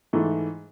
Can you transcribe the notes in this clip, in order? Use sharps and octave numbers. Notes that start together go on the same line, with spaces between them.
G#2 E3 A3